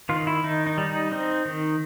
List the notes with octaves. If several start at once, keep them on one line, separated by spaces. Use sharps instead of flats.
D#3 F4
E4
D#3 D#4
D#4
G3
D#4
C4 D#4
D#3